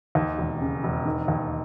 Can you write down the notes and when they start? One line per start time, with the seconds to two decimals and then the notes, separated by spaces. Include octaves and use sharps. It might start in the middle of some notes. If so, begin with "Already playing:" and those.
0.15 D#2
0.38 E1
0.61 C#3
0.84 E1
1.05 D#3
1.28 D#2